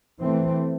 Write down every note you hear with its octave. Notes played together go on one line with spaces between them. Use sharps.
E3 A3 C4